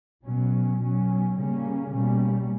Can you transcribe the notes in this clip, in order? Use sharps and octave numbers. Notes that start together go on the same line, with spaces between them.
B2 F#3 C#4
B2 F#3 C#4
C#3 G3 A#3 C#4
B2 G3 A#3 C#4